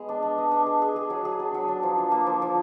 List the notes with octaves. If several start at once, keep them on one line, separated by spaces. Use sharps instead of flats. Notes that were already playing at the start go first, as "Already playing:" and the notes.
Already playing: G#3 B3
D4
D4
D#5
D4
G#4
G#4
G#4
F#3
G#4
D4
F#3
D4
F3
D4
A#3
F3
F3